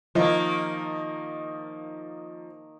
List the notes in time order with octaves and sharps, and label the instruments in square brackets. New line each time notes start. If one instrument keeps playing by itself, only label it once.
[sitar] D#3 A#3 [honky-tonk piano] F3 D#5